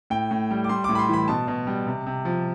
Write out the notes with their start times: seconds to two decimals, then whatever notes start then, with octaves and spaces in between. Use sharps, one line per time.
0.10 A2 G5
0.31 A2
0.51 G3
0.64 D6
0.69 G3 C6
0.84 A2 D6
0.95 B5
0.99 C6
1.09 E3 B5
1.28 B2 A5
1.48 B2
1.67 G3
1.87 C3
2.06 C3
2.25 F3